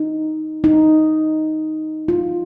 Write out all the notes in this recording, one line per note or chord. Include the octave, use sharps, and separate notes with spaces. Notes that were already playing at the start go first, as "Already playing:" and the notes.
Already playing: D#4
D#4
F4